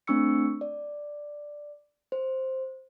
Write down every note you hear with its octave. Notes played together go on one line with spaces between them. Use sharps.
A3 C4 D4 C#6 E6 C#7
D5
C5